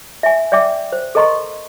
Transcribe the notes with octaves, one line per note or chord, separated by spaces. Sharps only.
E5 G#5
D5 E5 G5 D6
C5
A4 A#4 D#5 A#5 C6 C#6